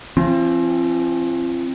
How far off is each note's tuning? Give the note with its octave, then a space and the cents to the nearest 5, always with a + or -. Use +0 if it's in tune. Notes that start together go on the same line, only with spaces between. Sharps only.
F3 -40 C4 +25